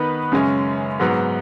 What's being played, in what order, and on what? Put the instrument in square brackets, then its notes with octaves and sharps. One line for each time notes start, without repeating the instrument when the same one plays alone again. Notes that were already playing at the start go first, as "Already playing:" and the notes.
Already playing: [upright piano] D#3 B3 D#4 B4
F#2 C#3 G#3 C#4
G#2 F#3 B3